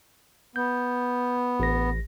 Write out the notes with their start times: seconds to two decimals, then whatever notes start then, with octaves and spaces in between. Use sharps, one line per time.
0.56 B3 G6
1.60 A1 A#6